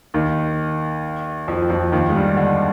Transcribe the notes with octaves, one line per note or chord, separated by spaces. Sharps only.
D#2 D#3
F2 F3
F2 F3
D#2 D#3
G#3
G2 G3
D3 D4